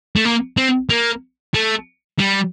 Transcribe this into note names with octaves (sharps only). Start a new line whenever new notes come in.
A3
A#3
C4
A#3
A3
G3